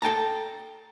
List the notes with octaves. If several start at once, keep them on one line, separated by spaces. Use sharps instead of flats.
A4 G5 A5 A#5